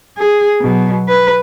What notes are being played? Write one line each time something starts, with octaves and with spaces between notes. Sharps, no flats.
G#4
B2 F#3
B4